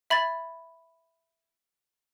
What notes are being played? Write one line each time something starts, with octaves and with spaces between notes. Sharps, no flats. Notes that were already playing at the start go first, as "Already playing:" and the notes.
E5 B5 G#6 A6